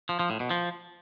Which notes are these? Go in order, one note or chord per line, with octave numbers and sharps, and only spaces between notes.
F3
F3
A2
B2
F3